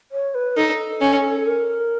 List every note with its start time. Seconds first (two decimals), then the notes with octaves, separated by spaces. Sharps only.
0.12 C#5
0.34 B4
0.57 D#4 A4
1.01 C#4
1.41 A4
1.47 A#4